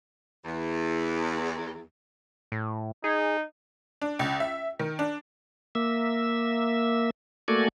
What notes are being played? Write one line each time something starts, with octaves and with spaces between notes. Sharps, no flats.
E2
A2
D#4 G#4
D4
C#2
E5
D#3
D4
A#3 E5
A3 A#3 F#4 A4 D5 G#5